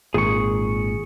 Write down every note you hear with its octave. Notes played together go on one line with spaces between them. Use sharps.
G#1 A#2 G#4 C#6